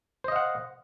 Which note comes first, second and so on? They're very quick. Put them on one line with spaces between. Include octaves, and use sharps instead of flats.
C5 D#5 F5 F#5